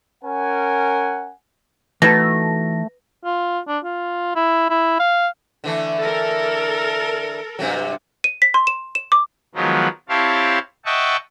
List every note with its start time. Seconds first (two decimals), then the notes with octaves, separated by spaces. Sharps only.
0.23 C#4 A#4 F#5 G#5
2.02 B2 E3 A3 D#4 A5 A#6
3.25 F4
3.68 D4
3.84 F4
4.35 E4
4.70 E4
4.99 F5
5.64 D3 E3 A3
6.01 A4 A#4
7.59 G2 C3 F#3
8.24 D#7
8.42 B6
8.54 C6
8.67 E7
8.95 E7
9.12 D6
9.55 D#3 F3 F#3 G#3 B3
10.09 C4 E4 G4 C#5 F5 A5
10.86 D#5 E5 F#5 G5 A5 C#6